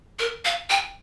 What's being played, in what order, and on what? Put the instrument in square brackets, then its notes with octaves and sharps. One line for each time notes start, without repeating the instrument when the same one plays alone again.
[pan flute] A#4
F5
G5